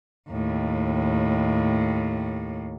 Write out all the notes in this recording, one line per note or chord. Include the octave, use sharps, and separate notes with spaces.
D#2 A2